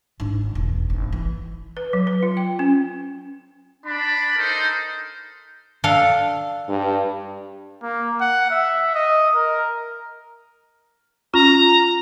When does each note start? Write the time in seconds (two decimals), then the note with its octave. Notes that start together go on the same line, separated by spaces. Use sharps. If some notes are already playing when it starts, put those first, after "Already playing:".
0.20 G#1 D4
0.55 E1
0.90 G#1
1.13 E3
1.77 B4
1.93 F#3
2.07 B4
2.23 F4
2.37 G5
2.59 C#4
3.86 D4 B5
4.36 D#4 A4 A#4 C5
5.84 D4 A4 F5
6.69 G2
7.83 A#3
8.21 F#5
8.51 E5
8.95 D#5
9.35 A#4
11.34 C#4 F4 A#5